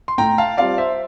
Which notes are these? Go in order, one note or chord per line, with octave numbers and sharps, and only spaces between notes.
C6
A2 G5 A#5
F5 A5
G3 C4 F4 D5 F5
C5 E5